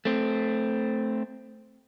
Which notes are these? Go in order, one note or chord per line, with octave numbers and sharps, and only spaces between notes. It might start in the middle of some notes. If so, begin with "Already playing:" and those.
A3 C4